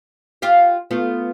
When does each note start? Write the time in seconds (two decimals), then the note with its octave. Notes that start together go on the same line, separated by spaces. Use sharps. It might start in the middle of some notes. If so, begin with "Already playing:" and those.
0.42 F4 G4 F5
0.91 A3 B3 F4